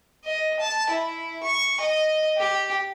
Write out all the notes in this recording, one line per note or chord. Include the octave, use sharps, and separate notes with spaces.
D#5
A5
E4
C#6
D#5
G4